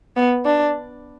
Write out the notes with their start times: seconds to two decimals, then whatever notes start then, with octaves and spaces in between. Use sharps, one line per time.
0.16 B3
0.45 D4